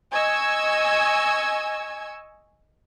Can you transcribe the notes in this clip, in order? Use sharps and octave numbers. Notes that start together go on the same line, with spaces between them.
D#5 G#5 C#6 E6 G#6